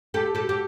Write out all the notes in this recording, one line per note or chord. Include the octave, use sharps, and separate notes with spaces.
G4 A4
G4 A4
G4